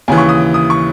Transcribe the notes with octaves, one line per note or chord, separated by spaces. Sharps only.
D#2 C#3 E3 G#5
C#6
D#6
D#6
C#6